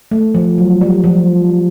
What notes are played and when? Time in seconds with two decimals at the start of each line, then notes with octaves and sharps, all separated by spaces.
0.11 A3
0.34 F3
0.58 F#3
0.81 G3
1.04 F3